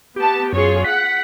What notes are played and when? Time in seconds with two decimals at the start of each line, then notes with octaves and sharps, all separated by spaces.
0.16 B3 G4 A5
0.53 F#2 F4 G#4 C#5
0.84 F#5 B6